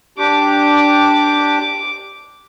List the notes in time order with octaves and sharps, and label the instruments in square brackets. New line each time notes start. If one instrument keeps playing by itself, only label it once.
[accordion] D4 G4 [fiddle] D6